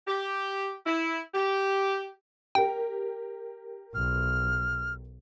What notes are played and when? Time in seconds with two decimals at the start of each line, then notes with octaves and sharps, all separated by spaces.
0.07 G4
0.86 E4
1.34 G4
2.55 G4 A#4 G5
3.95 B1 F6